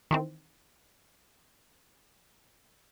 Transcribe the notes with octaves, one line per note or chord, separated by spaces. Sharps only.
D#3 E3 C4